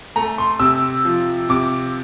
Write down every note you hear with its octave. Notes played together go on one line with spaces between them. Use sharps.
A3 A#5
C6
C3 E6
F3
C3 D6